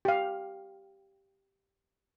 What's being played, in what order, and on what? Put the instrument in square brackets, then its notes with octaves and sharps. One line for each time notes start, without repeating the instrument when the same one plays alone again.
[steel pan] G4 F5